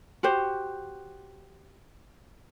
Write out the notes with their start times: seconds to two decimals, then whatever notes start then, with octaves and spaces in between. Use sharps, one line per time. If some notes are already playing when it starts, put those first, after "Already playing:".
0.23 F#4 G4 C5